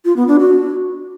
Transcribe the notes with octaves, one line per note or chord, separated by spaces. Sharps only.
F4
B3
D4
F#4